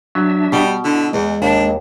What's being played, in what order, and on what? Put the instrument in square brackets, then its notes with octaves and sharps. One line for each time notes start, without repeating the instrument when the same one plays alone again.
[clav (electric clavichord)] F#3 [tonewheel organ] D4 E5
[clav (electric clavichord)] B2 [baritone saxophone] G3
[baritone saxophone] D3 [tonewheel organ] E4
[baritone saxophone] E2 [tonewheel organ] G#3
[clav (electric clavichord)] D#2 [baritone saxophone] D4